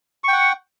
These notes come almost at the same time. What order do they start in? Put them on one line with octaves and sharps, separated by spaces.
C#6 G5 F#5